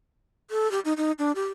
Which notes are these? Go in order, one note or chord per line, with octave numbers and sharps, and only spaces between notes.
A4
G4
D#4
D#4
D4
G4